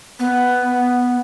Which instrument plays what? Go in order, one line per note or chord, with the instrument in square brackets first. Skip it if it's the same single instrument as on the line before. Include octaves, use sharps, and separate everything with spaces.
[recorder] B3